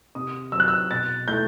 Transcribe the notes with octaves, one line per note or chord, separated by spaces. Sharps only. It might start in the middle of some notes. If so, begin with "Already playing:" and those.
C3 D#6
F#3 C4 E6
F#6
E6
B2 A6
A3 E4 G6